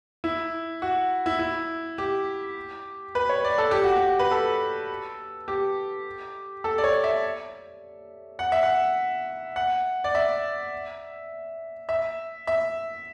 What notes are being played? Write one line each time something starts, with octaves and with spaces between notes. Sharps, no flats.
E4
F#4
E4
E4
G4
B4
C#5
D5
A4
G4
F#4
G4
B4
A4
G4
A4
D5
C#5
E5
F#5
E5
F#5
F#5
D5
E5
E5
E5